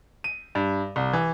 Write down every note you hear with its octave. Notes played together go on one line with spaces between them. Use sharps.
D#7
G2
C2
E3